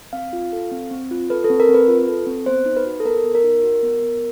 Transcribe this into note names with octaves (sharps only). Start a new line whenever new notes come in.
C4 F5
F4
A4
C4
C4
F4
A4 B4
A4
C4
A#4
C4
B4
F4
A4
C4
B3 C5
D#4
B4
F#4
A4
B3 A#4
B3
A#4
D#4
F#4
B3
B3